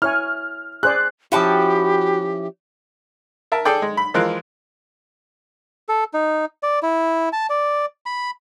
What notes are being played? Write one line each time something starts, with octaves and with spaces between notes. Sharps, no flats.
E4 C#5 G#5 F6
G#4 C5 D5 F#6
F3 C#4 E4 F#4 G4 G5 A5
A#4 E5 A5
G#4 A4 D5 G5
G#3
B5
E3 F3 G#3 A#4 F5 F#6
A4
D#4
D5
E4
A5
D5
B5